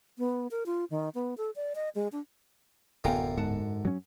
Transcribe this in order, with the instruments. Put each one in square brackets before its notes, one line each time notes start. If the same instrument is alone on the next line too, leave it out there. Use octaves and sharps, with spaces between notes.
[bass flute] B3
A#4
F4
D#3
B3
A4
D5
D#5
G#3
D4
[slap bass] D1 B3 [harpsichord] F#2 D3 A#5 [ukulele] F5 G5 G#5
[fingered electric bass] G#2 [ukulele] F#5 A5
[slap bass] F#3 C#4